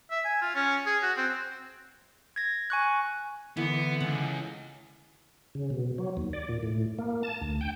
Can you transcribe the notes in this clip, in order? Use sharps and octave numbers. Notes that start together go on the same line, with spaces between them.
E5
G#5
F4
C#4
G#4
F#4
C4
G#6 A#6
G#5 C#6 F#6
D3 E3 B3
C#2 F#5
C#3
B2
F#3
D#2
D5
A#2
A2
A#3
A5
D2
G5